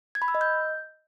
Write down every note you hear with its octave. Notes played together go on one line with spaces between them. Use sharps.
G#6
B5
E6
D#5
G6